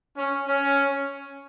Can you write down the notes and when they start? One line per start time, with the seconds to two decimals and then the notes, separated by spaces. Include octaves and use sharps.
0.17 C#4
0.46 C#4